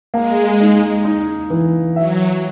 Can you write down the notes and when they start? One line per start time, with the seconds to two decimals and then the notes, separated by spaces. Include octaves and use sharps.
0.14 G#3 A#3
0.60 D#4
1.05 D#4
1.50 E3
1.96 F#3 E5